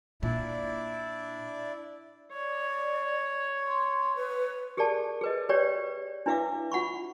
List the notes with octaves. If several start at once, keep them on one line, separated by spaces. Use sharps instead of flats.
A#2 D4 E4 D5
C#5 D5
C6
B4
G4 G#4 A#4 D5 A5
G#4 B4 D#5
G4 B4 C#5 D5 G5
D4 E4 B4 E5 F5 D6
F4 F#5 B5 C#6